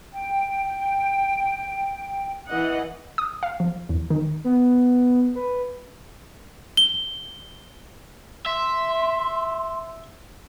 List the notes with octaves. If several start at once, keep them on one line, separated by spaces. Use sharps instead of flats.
G5
E3 D#5 F#5
D#6
F5
F3
E2
D#3
B3
B4
G7
E5 C6